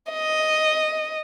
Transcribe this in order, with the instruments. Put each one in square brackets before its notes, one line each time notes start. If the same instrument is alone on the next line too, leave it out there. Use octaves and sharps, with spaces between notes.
[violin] D#5